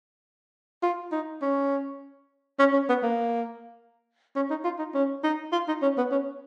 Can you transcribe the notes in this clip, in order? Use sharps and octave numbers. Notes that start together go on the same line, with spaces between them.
F4
D#4
C#4
C#4
C#4
B3
A#3
C#4
D#4
F4
D#4
C#4
D#4
F4
D#4
C#4
B3
C#4